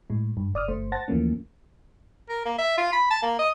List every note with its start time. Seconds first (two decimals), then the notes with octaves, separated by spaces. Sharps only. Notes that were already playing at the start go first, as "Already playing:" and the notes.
0.10 A2 G#3
0.37 G2
0.54 G1 D5 D#6 F6
0.68 G1 A3 C5
0.92 C5 F#5 A5 A6 A#6
1.08 D#2 E3 F3 A3 A#3 C#4
2.29 A#4
2.45 A#3
2.58 E5
2.78 F4
2.93 B5
3.10 A5
3.22 A#3
3.39 D#5